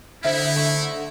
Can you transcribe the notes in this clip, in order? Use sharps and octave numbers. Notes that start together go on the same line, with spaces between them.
D3 D#4 E4 C5 E5
A3